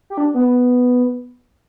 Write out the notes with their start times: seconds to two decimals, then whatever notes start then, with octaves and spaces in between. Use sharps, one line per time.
0.10 G4
0.18 D4
0.34 B3